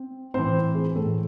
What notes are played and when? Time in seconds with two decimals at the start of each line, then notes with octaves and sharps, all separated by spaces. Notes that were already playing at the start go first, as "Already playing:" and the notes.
Already playing: C4
0.34 A2 E3 C4 C5
0.75 G#4
0.95 A2 E3 A3 A4